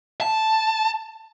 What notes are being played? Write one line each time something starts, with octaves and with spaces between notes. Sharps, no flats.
A5